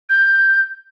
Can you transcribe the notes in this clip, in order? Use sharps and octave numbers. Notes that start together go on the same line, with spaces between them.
G6